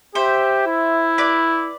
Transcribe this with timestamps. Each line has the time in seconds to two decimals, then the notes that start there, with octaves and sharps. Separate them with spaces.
0.15 G4 C5 E5
0.67 E4
1.18 B4 D5